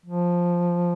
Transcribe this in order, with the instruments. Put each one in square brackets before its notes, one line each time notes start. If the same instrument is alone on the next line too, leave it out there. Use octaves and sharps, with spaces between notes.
[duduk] F3